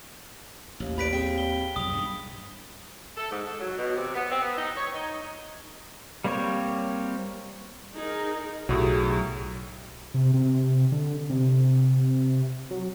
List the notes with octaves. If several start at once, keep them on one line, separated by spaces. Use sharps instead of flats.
A1 D#2
G4 B4 D5 B5 B6 D7
G3 C4 G#4 G5
G7
B1 F2 D#6 F7
G2 D#3
A4
G#2
A4
F#3
B2
C3
B3
C4
B3
D#4
C#5
D#4
G3 A#3 C4 G4 C#5
D#4 G#4 A#4
B1 A2 F#3 G4 G#4
C3
C3
D3
C3
F#3